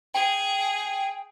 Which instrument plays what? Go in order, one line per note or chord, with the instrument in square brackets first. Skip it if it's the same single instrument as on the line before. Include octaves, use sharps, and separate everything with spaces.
[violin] G#4 [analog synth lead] G5